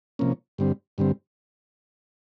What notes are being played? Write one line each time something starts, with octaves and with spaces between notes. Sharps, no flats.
C3 F3 A#3 C#4
G2 D3 G3 C4
G2 D3 G3 C4